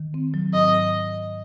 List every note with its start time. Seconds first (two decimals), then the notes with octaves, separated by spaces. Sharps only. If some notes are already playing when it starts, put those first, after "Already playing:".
Already playing: D#3
0.14 C4
0.34 F#3
0.54 G#2 D#5